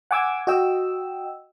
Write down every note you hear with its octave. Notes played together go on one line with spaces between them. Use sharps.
F#5 G#5 D6 E6 G#6
F#4 D#5 G5 E6